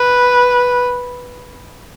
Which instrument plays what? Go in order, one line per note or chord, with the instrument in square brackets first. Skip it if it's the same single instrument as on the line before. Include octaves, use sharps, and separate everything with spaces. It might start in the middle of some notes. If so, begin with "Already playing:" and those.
Already playing: [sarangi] B4